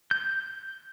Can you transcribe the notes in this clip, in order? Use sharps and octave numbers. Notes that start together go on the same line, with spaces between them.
G6